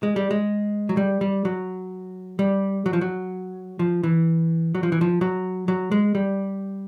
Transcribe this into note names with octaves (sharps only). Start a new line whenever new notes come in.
G#3
G3
G#3
F#3
G3
G3
F#3
G3
F#3
F3
F#3
F3
E3
F#3
F3
E3
F3
F#3
F#3
G#3
G3